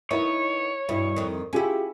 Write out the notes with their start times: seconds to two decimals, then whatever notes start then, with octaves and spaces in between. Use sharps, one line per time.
0.11 B3 D#4 E4 A#4 C#5
0.89 G2 B2 E4
1.16 F2 D#3
1.53 C#4 E4 F4 G4 G#4